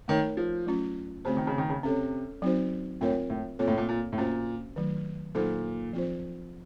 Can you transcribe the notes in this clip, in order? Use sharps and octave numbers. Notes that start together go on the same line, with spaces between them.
D#3 A3 D#4 A#4 C#5
F3
F#3 A3 C#4 F4
C#3 A3 C4 F#4 C5
D#3
C#3
D#3
C#3
C3 C#4 A4 C#5
F#3 C4 D#4 F#4 C5
A2 C4 F4 A#4 C#5
A2
A#2 C4 F4 A4 C#5
A2
A#2
A#2
A2
A#2 C#4 F#4 C5
D#3 F#3 A3
A#2 F#3 A#3 D#4 A4 C5
F3 C4 F4 C5